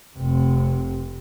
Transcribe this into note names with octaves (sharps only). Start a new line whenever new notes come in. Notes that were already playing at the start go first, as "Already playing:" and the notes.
F1 C3